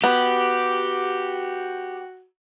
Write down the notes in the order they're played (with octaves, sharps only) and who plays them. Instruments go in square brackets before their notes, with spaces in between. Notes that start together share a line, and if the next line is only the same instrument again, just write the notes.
[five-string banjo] B3 [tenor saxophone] F#4 [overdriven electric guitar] G4